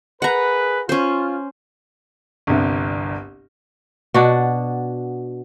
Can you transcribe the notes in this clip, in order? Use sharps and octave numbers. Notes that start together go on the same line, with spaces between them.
G#4 A#4 B4 F#5 A#5
C#4 F4 C5
G1 C2
B2 D4 F#4